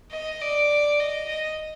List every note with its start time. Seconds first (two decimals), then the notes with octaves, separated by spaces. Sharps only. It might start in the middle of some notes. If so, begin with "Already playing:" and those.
0.11 D#5
0.42 D5
1.00 D#5
1.28 D#5